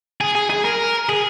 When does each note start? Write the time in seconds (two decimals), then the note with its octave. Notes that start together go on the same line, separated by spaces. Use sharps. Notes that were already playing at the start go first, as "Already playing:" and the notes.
0.21 G#4
0.35 G#4
0.50 G#4
0.65 A#4
1.09 G#4